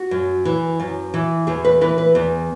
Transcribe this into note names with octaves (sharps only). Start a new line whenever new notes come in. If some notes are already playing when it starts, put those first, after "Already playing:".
Already playing: F#4
F#2
E3
F#2
E3
E2 G#4
B4
E3 B4
B4
E2